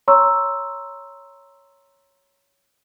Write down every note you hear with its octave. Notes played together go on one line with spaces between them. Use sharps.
C#5 A#5 C6 C#6 E6